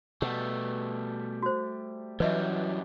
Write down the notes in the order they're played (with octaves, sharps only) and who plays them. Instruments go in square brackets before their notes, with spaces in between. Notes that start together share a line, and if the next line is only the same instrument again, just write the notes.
[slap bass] B2 [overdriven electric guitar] G3 A3 [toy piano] F#5
[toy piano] F#4 C5
[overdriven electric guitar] F#2 G3 [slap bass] E3 F#3 [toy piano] B4 D#5 E5